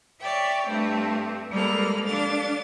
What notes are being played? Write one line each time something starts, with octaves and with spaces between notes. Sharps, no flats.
C#5 D5 E5 G5
G2 A3 C4
G3 G#3 A#3 A4 B4 F6
D4 F5 A6